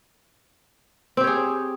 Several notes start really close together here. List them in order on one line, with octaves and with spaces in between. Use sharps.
C4 G4 C#5 G#4